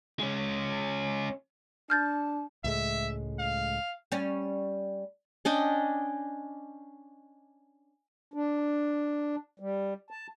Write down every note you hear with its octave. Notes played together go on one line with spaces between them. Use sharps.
G#3 C#4
D4 A5 F6 G6 A6
C#2 A2 G#3 E5
F5
G3 C#4
C#4 D4 D#5 G5
D4
G3
A5